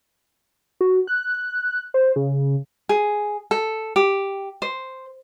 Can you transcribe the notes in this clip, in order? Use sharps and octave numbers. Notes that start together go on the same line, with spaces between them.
F#4
F#6
C5
C#3
G#4
A4
G4
C5